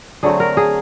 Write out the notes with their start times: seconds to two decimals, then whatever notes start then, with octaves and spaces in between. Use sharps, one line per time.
0.23 D3 F#3 A3 C4 G#4
0.40 A#4
0.57 G#4